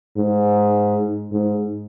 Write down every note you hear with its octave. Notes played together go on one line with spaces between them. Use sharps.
G#2
G#2